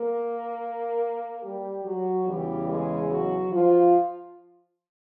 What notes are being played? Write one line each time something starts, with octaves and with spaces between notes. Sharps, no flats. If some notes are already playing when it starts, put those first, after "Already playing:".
Already playing: A#3 A#4
G3 G4
F#3 F#4
E2 C#3 E3 G3 G4
G#3 G#4
F#3 F#4
F3 F4